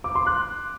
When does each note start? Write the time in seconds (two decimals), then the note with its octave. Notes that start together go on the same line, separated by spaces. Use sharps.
0.04 D6
0.15 C6
0.26 F#6